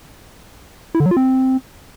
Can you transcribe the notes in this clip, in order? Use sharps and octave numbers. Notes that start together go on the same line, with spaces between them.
E4
D3
F#3
F4
C4